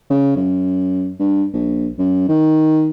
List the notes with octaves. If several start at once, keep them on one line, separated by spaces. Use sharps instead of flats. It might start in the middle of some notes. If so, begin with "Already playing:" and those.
C#3
F#2
G2
A#1
F#2
D#3